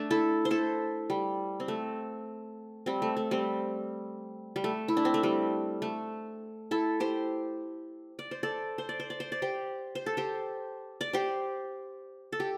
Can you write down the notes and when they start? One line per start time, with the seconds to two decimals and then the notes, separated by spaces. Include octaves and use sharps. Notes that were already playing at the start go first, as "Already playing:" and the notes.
Already playing: A3 D4
0.11 E4 A4
0.45 C5
0.51 E4 A4
1.10 G3
1.60 C4
1.68 A3
2.86 G3 C4
3.02 A3
3.17 A3
3.31 G3 C4
4.56 G3
4.64 A3
4.88 E4
4.97 D4
5.05 C4
5.14 A3
5.23 G3
5.82 A3
6.71 E4 A4
7.00 G4 C5
8.19 D5
8.31 C5
8.43 A4 D5
8.78 C5
8.89 D5
9.00 C5
9.10 D5
9.20 C5
9.32 D5
9.42 G4 C5
9.95 C5
10.06 A4
10.17 G4 C5
11.01 D5
11.13 G4 C5
12.33 A4
12.40 G4